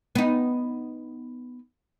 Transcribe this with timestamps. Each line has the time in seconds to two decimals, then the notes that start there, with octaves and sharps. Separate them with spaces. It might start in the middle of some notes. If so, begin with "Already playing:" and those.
0.15 B3 D#4